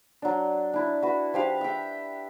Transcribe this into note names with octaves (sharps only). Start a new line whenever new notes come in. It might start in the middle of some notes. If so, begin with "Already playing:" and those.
F#3 D4
D4 E4
F#4 B4
F3 G4 F5
E5 G5